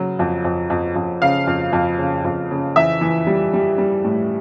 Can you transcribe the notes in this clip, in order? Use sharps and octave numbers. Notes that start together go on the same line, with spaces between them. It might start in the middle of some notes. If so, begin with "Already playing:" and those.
Already playing: C#3 F#3
F2
F2
F2
F2
C#3 F5
F2
F2
C#3
F2
C#3
E3 E5
E3
G3
G3
G3
A2